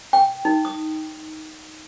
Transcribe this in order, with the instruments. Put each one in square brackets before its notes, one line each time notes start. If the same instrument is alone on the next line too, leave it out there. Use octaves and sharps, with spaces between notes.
[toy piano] G5
D#4
D#6